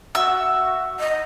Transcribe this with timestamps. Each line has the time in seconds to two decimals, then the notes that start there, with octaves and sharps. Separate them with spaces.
0.15 F#4 E5 E6
0.99 D#5